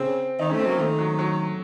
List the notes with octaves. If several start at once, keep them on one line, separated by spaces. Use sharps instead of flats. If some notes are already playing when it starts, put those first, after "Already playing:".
Already playing: C#3 C4
D#3 D#4
A3 C#4
C4
F#3 A#3
D#3 A3
F#3
F#3